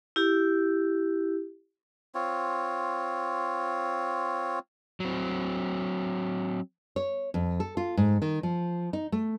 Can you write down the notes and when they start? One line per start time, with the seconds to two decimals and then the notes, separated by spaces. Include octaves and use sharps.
0.16 E4 G4
2.15 C4 F4 C#5
5.00 F#3 C4
6.96 C#5
7.34 F2
7.60 A4
7.77 F4
7.97 G#2
8.22 D#3
8.43 F3
8.93 D#4
9.12 A3